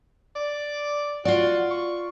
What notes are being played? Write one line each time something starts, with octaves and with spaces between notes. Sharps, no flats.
D5
F4 F#4 D5
C#6